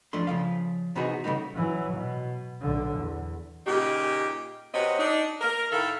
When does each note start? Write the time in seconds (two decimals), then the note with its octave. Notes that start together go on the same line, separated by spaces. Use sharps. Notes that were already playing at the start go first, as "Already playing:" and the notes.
0.13 E2 F3 A3 D4 C6
0.27 C#3 F3 F5
0.95 C3 E3 B3 D#4 F#4 G#4
1.24 C#3 G3 A3 B3 D#4
1.55 E3 F#3
1.94 B2
2.61 B1 D3
2.97 E2
3.67 A#2 C#3 D#4 G4
4.74 C3 C4 F#4 B4 C#5 D#5
4.99 D4 D#4
5.41 A#4
5.72 A2 D#3 A3 A4 E5 F5